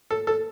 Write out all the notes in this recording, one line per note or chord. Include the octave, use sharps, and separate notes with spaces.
A4
A4